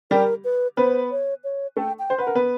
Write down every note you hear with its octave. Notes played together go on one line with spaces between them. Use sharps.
G3 G4 A#4
B4
B3 B4 C5
C#5
C#5
A3 A4 G5
G5
C5
B4 F#5
A#4
B3 B4